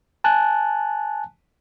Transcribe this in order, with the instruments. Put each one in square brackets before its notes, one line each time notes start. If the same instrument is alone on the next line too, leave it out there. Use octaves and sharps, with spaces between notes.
[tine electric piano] G#5 A5 F#6